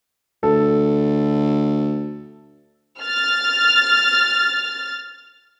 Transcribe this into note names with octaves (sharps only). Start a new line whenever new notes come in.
D2 A4
F6 A6